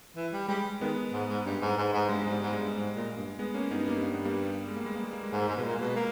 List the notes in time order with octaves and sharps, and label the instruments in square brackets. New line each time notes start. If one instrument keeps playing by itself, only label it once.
[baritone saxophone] E3
G3
[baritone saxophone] G3 [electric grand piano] G#3
[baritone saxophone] D#3 [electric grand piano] G#3 B3
[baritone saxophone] G#2
G#2
G2
G#2
G#2
G#2
[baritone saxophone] G2 [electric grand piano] G#3
[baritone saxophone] G#2 [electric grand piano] G#3
[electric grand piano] G3
[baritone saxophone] G#2
[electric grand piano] G#3
[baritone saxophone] G2
G#2
A#2
G2
[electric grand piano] G#3 B3
A#3 C#4
[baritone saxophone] G2 [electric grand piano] B3 D#4
[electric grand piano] G3 A#3
A#3
B3
G3 A#3
G#3
A#3
G#3
A#3
G#3
A#3
G#3
[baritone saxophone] G#2 [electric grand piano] A#3
[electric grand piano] G#3
[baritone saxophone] G#2 [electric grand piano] A#3
[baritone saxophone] B2
[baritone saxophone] A#2 [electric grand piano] G#3
[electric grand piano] A#3
[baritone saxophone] B2 [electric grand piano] G#3
[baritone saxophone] A#3